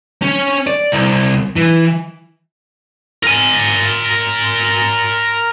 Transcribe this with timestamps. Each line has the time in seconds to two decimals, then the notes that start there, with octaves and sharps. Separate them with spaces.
0.22 C#4
0.67 D5
0.92 C2
1.56 E3
3.23 A#4 G#5